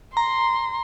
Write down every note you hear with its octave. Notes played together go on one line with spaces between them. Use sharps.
A#5 C6